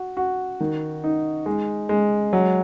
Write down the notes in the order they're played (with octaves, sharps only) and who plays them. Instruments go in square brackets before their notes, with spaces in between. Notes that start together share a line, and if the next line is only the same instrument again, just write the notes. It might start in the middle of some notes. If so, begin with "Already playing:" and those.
Already playing: [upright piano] F#4
F#4
D#3
D#4
G#3
G#3
F#3